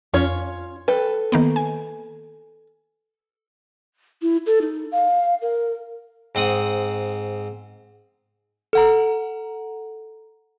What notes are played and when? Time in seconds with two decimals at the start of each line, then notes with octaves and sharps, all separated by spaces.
0.14 F2 C#4 F4 C#5
0.88 A4 B4 G5
1.32 D#3 A#3 B3
1.56 G#5
4.22 E4
4.46 A4
4.61 D#4
4.92 F5
5.42 A#4
6.35 G#2 C4 F#5 D#6
8.73 A4 F#5 A#5